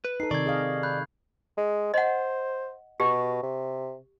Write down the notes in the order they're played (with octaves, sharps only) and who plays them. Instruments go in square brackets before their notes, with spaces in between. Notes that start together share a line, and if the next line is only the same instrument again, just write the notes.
[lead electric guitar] B4
[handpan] D#4 A4 [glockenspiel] C7
[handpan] C3 D#3 [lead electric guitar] D5 [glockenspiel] C#6 G#6
[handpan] G#4 D#5 F5
[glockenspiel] B5 F#6 G6
[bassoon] G#3
[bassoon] C5 [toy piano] D#5 F#5
[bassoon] B2 [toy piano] G4
[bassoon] C3